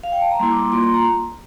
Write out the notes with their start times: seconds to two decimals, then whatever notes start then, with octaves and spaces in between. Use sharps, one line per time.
0.03 F5
0.12 G5
0.21 A5
0.31 A#5
0.40 G3 A#3 E4 C6
0.51 D6
0.62 C6
0.72 A#3 F4 C6
0.83 C6
0.94 A#5